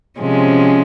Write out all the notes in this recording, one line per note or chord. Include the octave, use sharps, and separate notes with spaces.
C3 F3 G#3 C#4